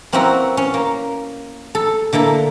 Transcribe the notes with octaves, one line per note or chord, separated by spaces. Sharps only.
A#3 C4 C#4 E4 F#4 B4
C#4
A#3
A4
D3 A#3 E4 A4